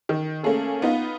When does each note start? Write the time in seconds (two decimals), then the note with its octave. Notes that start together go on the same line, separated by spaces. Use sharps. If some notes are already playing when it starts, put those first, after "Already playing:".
0.09 D#3
0.43 A3 A#3 C#4 G#4 A4
0.82 B3 D#4 F4